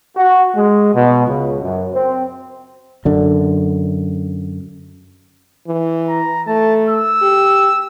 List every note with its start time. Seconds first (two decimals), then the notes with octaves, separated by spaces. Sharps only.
0.17 F#4
0.56 G#3
0.95 B2
1.27 C#2
1.63 F#2
1.94 C4
3.05 F#2 D3
5.68 E3
6.09 A#5
6.47 A3 A5
6.89 E6
7.22 G4